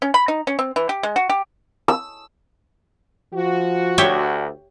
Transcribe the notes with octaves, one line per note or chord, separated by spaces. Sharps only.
C#4
B5
D#4
C#4
C4
E3
G4
G#3
F#4
G4
E6
F3 F#4
D2 G4 C#5 E5